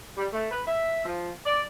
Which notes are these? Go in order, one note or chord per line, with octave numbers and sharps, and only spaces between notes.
G3
A3
B4
E5
F3
D5